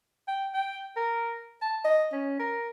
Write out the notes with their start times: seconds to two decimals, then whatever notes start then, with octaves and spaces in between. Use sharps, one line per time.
0.28 G5
0.54 G5
0.96 A#4
1.61 A5
1.84 D#5
2.12 C#4
2.39 A#4